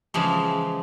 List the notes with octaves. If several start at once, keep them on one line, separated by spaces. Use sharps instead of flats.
C#3 E3 F3 G#3